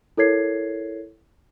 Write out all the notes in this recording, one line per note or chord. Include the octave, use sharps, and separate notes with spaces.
E4 A4 A#4 C#5 G#6 C7